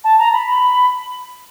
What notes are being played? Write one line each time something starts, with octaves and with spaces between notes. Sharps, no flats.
A5
A#5
B5
B5